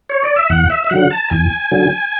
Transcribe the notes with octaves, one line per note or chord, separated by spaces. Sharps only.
C#5
D5
E5
E2 F#5
E5
E5
D3 F#3 F#5
A5
E2 G#5
D3 F#3